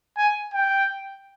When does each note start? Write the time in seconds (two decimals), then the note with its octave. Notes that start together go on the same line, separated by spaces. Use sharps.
0.17 G#5
0.54 G5